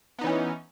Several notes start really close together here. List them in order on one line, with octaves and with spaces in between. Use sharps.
B3 D#4 E3 C#4